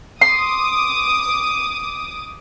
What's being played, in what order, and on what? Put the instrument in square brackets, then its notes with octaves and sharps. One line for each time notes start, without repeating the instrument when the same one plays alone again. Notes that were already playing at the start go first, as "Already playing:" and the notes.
[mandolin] C6 [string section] D6 D#6